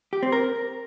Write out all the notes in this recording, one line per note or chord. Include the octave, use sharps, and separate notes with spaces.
G4
C4
A#4